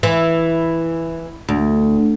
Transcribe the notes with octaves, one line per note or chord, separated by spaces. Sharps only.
E3
D2